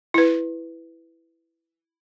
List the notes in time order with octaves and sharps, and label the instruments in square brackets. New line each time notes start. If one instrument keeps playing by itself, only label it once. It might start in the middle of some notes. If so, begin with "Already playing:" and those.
[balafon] E4 B4